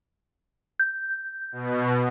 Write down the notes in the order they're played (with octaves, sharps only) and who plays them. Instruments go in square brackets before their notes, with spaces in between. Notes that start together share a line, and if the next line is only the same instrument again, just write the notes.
[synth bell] G6
[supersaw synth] B2